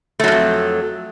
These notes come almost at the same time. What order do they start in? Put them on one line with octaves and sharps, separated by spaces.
A3 F#3 G#2 F2